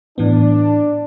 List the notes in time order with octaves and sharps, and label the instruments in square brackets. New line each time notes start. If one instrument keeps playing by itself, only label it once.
[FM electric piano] A2 E3 B3 [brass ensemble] D4